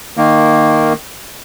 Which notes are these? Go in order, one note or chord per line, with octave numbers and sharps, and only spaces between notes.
D#3 A#3